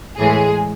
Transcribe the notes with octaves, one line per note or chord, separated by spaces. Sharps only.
A2 E3 G#3 G#4